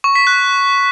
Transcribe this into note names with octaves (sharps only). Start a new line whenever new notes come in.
C#6
B6
F#6